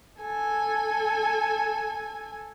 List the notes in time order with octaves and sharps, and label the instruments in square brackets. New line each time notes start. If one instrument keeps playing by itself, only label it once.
[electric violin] A4 G#5